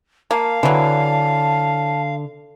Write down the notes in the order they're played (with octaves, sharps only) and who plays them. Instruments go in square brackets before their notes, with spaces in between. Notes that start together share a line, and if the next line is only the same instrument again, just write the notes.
[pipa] A#3 [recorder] F5 [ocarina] A5
[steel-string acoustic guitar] D3 [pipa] E3 F#3